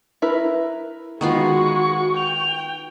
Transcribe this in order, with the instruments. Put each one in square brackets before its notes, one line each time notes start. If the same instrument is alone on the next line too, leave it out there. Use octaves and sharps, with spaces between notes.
[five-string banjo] E4 A#4 B4
[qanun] D#3 B3 F4 [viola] G#3 F#4 [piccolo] C#6
[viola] G5 [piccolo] F7